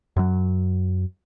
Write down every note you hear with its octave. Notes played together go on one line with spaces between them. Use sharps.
F#2 F#3